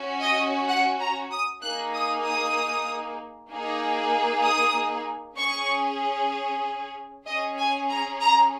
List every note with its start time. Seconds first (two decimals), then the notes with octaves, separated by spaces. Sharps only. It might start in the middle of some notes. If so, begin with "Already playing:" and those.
Already playing: C#4 F#4
0.21 D#5
0.68 F#5
0.99 A#5
1.31 D#6
1.61 A#3 D#4 G#4 F#6
1.94 D#6
2.24 D#6
3.50 A#3 D#4 G#4
4.44 D#6
5.38 C#4 G#4 C#6
7.26 C#4 G#4 D#5
7.58 G#5
7.89 A#5
8.21 A#5